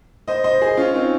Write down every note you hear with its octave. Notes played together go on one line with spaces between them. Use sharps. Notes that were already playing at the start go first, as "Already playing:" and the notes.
C5 D#5
C5 D#5
G#4 C5
C#4 F4
C4 D#4